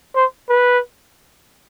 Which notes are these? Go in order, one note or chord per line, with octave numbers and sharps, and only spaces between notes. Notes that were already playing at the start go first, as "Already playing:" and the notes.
C5
B4